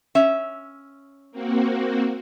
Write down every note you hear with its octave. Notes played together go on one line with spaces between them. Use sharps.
C#4 E5
A#3 C4 F#4